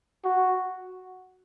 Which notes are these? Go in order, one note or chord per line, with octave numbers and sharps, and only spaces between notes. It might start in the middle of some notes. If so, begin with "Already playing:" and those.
F#4